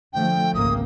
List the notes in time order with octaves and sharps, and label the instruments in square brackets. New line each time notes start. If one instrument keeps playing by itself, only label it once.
[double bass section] D3 F3 A3 [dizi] G5
[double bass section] G#1 C#2 A#3 [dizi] D#6